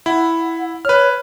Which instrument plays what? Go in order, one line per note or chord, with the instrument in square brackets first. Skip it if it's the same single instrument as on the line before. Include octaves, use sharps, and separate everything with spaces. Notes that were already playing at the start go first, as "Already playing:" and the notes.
[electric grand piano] E4 [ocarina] F#5
[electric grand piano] B4 F6 [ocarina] C#5